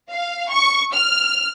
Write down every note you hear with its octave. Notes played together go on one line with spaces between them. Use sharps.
F5
C#6
F6